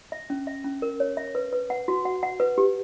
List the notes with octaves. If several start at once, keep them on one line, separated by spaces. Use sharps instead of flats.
E5
C#4
E5
C#4
A#4
C#5
E5
B4
B4
F#5
F#4
F#5
F#5
B4
G4